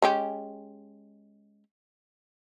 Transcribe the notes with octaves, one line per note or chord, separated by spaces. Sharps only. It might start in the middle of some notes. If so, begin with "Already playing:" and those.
G#3 C#4 G4